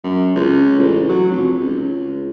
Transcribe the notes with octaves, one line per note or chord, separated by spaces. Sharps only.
F#2
C#2
A1
F#3
F1
C#2